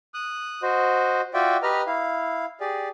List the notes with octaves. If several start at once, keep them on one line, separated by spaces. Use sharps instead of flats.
D#6 F#6
F#4 C5 D#5
F4 F#4 D5 E5 G5
G4 B4 D#5 A#5 F6
E4 F5
G4 G#4 D5